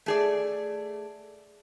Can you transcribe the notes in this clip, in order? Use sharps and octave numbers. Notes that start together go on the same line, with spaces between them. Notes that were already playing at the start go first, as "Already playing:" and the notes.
A3 G#4 D5